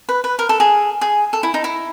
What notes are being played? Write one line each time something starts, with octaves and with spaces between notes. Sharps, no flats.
B4
B4
A#4
A4
G#4
G#4
A4
E4
D#4
E4